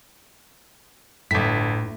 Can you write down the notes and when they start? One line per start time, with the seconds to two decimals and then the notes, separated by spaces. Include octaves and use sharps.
1.31 G1 A2 B6